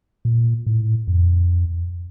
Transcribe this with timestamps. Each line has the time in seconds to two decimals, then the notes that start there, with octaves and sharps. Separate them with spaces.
0.25 A#2
0.66 A2
1.08 F2